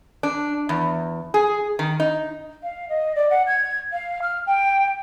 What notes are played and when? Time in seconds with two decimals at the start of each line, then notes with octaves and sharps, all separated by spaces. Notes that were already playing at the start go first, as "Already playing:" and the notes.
0.23 D4
0.69 E2
1.34 G#4
1.79 D#3
2.00 D#4
2.63 F5
2.89 D#5
3.15 D5
3.30 F#5
3.47 G#6
3.92 F5
4.22 F6
4.46 G5